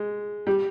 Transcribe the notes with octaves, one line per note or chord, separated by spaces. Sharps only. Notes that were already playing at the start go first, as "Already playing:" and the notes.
Already playing: G#3
G3